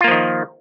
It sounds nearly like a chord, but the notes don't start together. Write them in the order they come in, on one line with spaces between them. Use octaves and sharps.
F4 A#3 F3 D#3